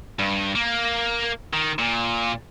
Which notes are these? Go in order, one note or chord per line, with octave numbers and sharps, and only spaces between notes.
G2
A#3
D#3
A#2